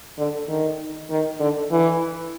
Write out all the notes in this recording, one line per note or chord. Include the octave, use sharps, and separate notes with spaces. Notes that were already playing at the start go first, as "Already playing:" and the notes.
D3
D#3
D#3
D3
E3